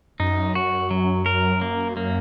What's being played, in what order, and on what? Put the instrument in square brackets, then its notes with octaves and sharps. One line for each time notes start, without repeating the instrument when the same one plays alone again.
[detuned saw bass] F#2 [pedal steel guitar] D#4
[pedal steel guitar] F#4
F#3
A#4
A#3
A#3